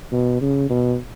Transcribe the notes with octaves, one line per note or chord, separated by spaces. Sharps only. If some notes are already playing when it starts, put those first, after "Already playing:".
B2
C#3
B2